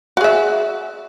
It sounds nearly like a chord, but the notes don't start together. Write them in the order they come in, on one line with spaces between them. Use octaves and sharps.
F#4 G#4 E5